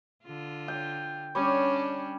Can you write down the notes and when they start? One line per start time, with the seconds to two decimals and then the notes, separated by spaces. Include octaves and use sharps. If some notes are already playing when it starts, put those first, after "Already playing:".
0.25 D3 F4
0.68 G5
1.35 G3 C#4 D4 C#5